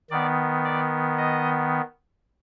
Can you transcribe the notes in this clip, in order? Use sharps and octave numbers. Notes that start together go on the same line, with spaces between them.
D#3 B3 D5
D5
D#5